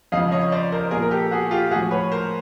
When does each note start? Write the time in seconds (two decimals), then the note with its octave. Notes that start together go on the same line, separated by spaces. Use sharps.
0.12 F2 C#3 F3 D#5 F5
0.31 C#5 D#5
0.52 C5 D5
0.72 A#4 C5
0.91 A#2 G#4 A#4
0.97 F3
1.02 A#4
1.11 G4 A4
1.31 F#4 G#4
1.51 F4 G4
1.71 A2 F#4 G#4
1.76 F3
1.91 B4 C#5
2.12 A#4 C5